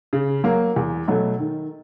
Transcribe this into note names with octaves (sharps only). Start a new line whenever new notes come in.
C#3
F#3 A#3
E2
B2 F#3 A3
D#3